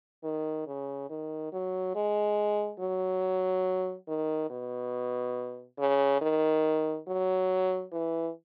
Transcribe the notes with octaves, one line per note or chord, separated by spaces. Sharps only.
D#3
C#3
D#3
F#3
G#3
F#3
D#3
B2
C#3
D#3
F#3
E3